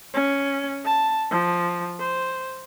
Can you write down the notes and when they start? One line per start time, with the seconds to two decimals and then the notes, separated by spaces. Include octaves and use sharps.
0.14 C#4
0.85 A5
1.31 F3
2.00 C5